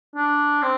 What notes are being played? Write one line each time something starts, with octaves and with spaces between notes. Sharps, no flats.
D4
C4